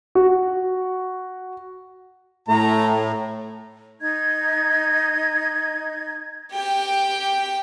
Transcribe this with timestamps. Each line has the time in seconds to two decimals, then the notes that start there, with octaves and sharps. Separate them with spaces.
0.15 F#4
2.48 A2 A3 A#5
4.01 D#4 D#5 G#6
6.53 G4 G5